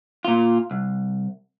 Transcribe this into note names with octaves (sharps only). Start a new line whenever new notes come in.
A#2 F4
C2